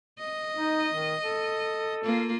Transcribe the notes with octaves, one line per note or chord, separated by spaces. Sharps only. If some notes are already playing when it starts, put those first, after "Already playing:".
D#5
D#4
D#3
A4
A#3 F4